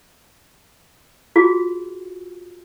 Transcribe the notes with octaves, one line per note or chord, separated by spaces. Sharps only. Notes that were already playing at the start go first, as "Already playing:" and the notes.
F4 F#4 G#4